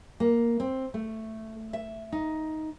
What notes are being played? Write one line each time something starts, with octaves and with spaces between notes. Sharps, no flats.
A#3
C4
A3
E5
D#4